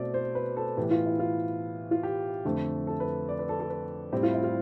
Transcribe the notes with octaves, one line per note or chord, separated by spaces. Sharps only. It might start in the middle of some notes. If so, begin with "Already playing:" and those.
Already playing: B2 A3 C4 D5
C5
B4
A4
A2 E3 B3 G4
F4
E4
F4
F4
G4
F2 D3 A3
A4
B4
D5
B4
A4
A4
B4
A2 G3 C4 E4 G4
F4
E4
F4